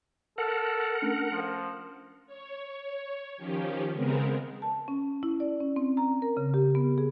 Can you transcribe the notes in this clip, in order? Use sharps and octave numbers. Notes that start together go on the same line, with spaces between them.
A4 A#4 F#5
A3 C#4 D4
F3
C#5
D#3 F3 C#4 G4
C#3 G#3 B3 C4 A#4
A5
C#4
E4
D5
C#4
C4
A#5
A#4
C#3
G4
B3
G#4